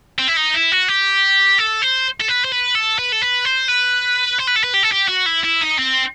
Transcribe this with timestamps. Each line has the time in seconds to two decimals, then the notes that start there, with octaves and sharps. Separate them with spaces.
0.19 C4
0.28 E4
0.37 D#4
0.54 E4
0.72 F#4
0.88 G4
1.58 A4
1.82 C5
2.21 A4
2.29 B4
2.44 C5
2.52 B4
2.75 A4
2.99 B4
3.12 A4
3.22 B4
3.45 C5
3.68 B4
4.39 C5
4.47 B4
4.56 A4
4.64 B4
4.74 G4
4.83 A4
4.92 G4
5.08 F#4
5.26 E4
5.44 E4
5.61 D#4
5.78 C4